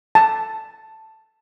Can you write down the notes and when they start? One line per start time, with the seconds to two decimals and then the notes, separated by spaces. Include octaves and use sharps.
0.15 A5